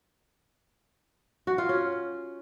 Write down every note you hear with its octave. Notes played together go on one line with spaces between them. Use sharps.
F#4
F4
C#4